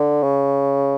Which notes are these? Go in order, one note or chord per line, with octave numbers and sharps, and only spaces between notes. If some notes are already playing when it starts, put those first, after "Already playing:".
Already playing: D3
C#3